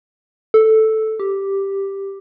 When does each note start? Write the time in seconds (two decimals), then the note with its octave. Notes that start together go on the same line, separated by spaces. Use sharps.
0.54 A4
1.20 G4